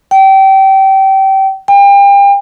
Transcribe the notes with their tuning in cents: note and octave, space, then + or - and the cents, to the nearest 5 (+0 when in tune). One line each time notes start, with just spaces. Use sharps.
G5 -25
G5 +35